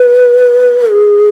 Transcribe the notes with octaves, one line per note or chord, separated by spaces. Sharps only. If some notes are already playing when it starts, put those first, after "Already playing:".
Already playing: B4
G#4